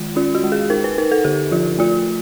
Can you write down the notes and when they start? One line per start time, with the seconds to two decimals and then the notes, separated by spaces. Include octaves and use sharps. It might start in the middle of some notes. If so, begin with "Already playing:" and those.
Already playing: D#3 G#3 F4
0.16 C#4 F4
0.35 F#4
0.44 G#3
0.52 G#4
0.70 D#4 A#4
0.84 B4
0.98 D#4 A#4
1.12 A4
1.24 D3 G4
1.51 F3 F4
1.79 A3 F4